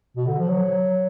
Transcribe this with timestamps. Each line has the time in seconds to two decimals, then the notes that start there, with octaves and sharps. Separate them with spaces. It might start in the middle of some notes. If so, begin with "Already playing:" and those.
0.17 B2
0.27 D3
0.39 F3
0.49 F#3